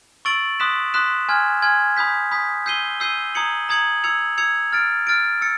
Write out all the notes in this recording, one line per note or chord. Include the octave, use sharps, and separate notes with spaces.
C#6 E6 A6 D7 F#7
C6 D#6 F#6 B6 E7
C6 D#6 F#6 B6 E7
G#5 C6 F6 G#6
G#5 C6 F6 G#6
B5 D#6 G6 B6
B5 D#6 G6 B6
E6 G6 C7 D#7 G7
E6 G6 C7 D#7 G7
A#5 D#6 G#6 C#7 F#7
A#5 D#6 G#6 C#7 F#7
E6 G#6 C#7 F7
E6 G#6 C#7 F7
F6 A6 D7
F6 A6 D7
E6 A6 C#7